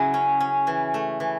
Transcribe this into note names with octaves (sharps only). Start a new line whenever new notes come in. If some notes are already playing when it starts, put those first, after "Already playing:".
Already playing: C#3 F#3 E4 F#4 G#4
C#4
C#4
E3
A3
E3